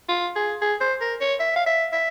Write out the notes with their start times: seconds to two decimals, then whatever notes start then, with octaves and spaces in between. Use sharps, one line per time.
0.09 F4
0.36 G#4
0.61 G#4
0.81 C5
1.01 A#4
1.21 C#5
1.40 E5
1.56 F5
1.66 E5
1.93 E5